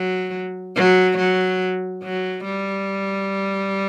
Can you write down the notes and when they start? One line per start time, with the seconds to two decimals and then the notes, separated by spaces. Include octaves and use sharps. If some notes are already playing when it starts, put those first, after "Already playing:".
Already playing: F#3
0.76 F#3
1.18 F#3
2.03 F#3
2.44 G3